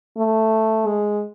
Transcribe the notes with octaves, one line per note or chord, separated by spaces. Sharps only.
A3
G#3